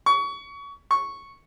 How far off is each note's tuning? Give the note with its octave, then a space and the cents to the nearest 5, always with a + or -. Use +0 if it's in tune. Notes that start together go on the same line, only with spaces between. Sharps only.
C#6 +25
C#6 -5